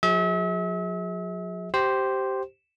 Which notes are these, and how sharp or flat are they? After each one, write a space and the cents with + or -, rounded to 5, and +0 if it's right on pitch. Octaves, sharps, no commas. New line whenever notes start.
F#3 -45 G#4 +0 E5 -40
G4 -15 C5 +0